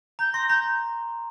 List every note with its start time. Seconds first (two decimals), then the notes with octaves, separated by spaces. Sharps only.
0.19 A#5 G6
0.34 C6 A#6
0.49 A#5 G6